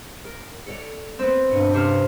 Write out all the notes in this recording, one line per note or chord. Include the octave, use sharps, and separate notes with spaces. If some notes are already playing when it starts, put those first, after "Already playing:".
A#4
A4 C#5 D5
B3 C4
D2 G2 B2 F#4
C3 C#4 C5 F6